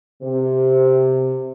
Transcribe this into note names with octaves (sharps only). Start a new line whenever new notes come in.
C3